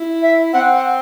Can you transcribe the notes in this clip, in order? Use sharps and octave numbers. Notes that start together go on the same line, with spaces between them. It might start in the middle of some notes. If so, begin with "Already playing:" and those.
Already playing: E4
E5
C4 F#5
F#5